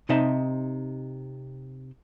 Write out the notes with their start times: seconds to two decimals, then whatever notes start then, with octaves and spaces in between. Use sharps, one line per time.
0.09 C3 D#4 C5 D#5 E5 A5